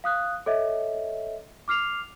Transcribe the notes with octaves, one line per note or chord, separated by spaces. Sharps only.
F5 D#6 F#6
A4 C#5 D#5 E5
D6 F6 C7 F7